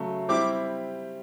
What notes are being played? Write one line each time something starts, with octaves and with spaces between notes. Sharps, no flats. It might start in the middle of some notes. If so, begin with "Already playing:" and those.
Already playing: C#3 F#3 A3
G3 C4 E4 G4 D6